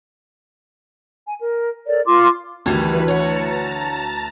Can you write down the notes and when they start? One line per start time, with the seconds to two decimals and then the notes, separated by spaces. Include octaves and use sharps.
1.27 G#5
1.40 A#4
1.87 A4 A#4 C#5 D5
2.05 F4 C6 D6
2.66 D2 D#3 E3 G3 D#4 B4 G#6
3.08 C#5 F#5 A5 A#5 A6